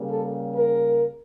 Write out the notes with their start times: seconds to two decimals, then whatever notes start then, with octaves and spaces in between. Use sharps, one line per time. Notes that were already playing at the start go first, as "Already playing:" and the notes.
Already playing: C#3 G3 A#3
0.11 A4
0.54 A#4